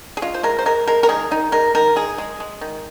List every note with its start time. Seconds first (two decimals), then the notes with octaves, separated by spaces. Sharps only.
0.17 G#4
0.22 G#3 F4
0.34 C5
0.43 G#3 A#4
0.59 C5
0.66 G#3 A#4
0.87 G#3 A#4
1.03 A#4
1.09 D#3 G#4
1.31 D#3 D#4
1.52 G#3 A#4
1.75 D#3 A#4
1.96 G#3 G#4
2.18 G#3
2.40 G#3
2.61 D#3